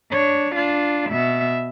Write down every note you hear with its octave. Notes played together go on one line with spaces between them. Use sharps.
D4 C#5
D4 F4
B2 E5